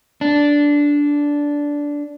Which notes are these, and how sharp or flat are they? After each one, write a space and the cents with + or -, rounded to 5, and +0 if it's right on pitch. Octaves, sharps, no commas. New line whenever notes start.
D4 -10